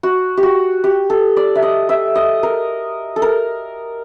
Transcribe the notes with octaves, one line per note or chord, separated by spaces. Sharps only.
F#4
G4
F#4
G4
A4
D5
E5
D#5
E5
D#5
A#4
A4
A#4